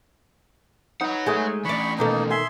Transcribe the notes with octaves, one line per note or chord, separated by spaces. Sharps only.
D#4 B4 C#5 F#5
G#3 A3 D#5 G#5
E3 A3 D4 D5 B5 C#6
B2 D#3 A#3 D#4 A4
E5 G#5 C6